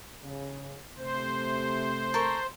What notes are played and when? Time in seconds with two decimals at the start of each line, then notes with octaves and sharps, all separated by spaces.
0.24 C#3
0.97 C3 A3 C5
2.14 A4 A#4 C#6